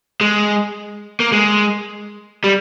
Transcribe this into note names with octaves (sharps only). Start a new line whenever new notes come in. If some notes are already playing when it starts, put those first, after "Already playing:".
G#3
A#3
G#3
G3